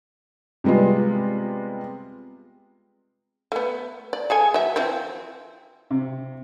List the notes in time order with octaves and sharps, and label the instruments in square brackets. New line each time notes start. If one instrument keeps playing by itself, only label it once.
[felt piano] C3 G3 G#3 B3 F4
[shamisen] A3 B3
D5
G#4 A4 G#5
F#3 E5
E3 F3 C4
[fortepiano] C3